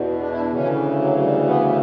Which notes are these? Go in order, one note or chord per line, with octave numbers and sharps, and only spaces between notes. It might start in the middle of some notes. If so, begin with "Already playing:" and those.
Already playing: E2 B2
D4
E4
D4
D2 C#3 E3 C#4
F#3
G3
B3